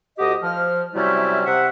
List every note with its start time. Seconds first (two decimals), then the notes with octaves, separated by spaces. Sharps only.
0.19 D2 F#4 G4 D#5
0.43 F3 F6
0.95 C3 F#3 G3 A3 C#4 E4
1.46 C3 E5 F#5